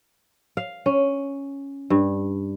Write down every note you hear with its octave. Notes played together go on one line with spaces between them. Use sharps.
F5
C#4
G2